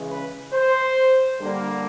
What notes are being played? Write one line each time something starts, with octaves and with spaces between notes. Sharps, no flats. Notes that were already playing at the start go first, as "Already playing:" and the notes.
Already playing: C#3 E3 G#3
B4
C5
D3 G3 A#3